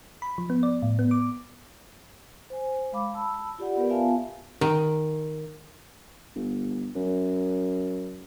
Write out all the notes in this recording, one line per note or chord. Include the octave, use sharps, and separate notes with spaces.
B5
F3
B3
D5
A2
B3
D6
C5 G#5
G#3 F5 B5 D6
A5 B5 E6
F4 G4 D5 F#5
B3 G4 A#4 B4 D5
B3 F4 E5 F5 G#5 A5
D#3
G1
F#2